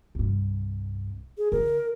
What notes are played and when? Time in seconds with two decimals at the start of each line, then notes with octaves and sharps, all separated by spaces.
0.15 C2 G2
1.38 G#4
1.52 D3 A#4